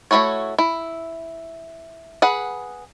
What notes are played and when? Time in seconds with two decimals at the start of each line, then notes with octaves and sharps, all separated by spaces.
0.11 A3 C4 E4 F#4 C#5
0.58 E4
2.22 G#4 B4 F#5